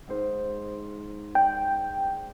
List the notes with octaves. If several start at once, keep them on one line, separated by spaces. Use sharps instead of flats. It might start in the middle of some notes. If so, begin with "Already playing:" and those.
G#2 C5
D5 G5